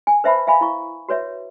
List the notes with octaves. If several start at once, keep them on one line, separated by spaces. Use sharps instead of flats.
G#5
B4 C5 E5 F#5 A5 B5
E5 F5 G#5 B5
E4 F5 C#6
F#4 B4 C#5 E5